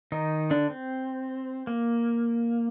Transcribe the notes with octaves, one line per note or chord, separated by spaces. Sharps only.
D#3 D#4
D3 D4
C4
A#3